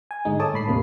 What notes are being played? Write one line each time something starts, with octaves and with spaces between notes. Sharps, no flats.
G#5
G#2 D3 G#3 D#4
A4 C#5 A5 D6 D#6
A2 B5 C7
E2 A2 C3 A#3